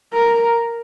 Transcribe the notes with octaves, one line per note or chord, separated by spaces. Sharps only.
A#4